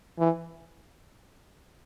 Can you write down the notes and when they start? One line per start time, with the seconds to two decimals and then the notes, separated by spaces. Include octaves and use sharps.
0.19 E3